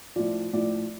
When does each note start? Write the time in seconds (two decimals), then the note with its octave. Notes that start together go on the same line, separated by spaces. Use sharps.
0.16 A2 F3 D5
0.53 A2 F3 D5